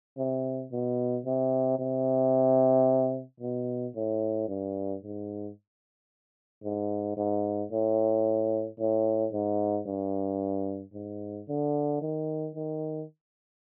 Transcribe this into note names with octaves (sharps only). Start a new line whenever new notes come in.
C3
B2
C3
C3
B2
A2
G2
G#2
G#2
G#2
A2
A2
G#2
G2
G#2
D3
D#3
D#3